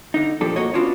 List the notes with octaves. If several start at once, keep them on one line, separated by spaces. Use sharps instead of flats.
D3 D#4
A#2 F3 D4 G4 A4
A#3 F#4 C#5 D#5
B3 C#4 D4 F4 F#4